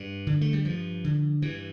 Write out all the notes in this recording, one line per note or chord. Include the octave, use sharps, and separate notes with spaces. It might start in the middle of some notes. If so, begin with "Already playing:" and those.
Already playing: G2 G3
D3
A3
G3
G2 F3
D3
G2 E3